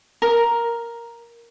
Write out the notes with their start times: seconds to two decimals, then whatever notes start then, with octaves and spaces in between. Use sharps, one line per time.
0.22 A#4